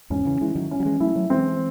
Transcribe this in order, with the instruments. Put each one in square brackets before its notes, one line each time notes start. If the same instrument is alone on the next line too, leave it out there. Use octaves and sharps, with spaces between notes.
[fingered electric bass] E2 G#2 [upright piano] C#4
[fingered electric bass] C#3 E3
[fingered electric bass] E3 G#3 [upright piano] E4
[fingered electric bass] D#3 F#3
[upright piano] C#4
[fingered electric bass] F#3
E3 G#3
[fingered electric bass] F#3 A3 [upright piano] E4
[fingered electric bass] F#3 A3
[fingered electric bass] E3 G#3 [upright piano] C4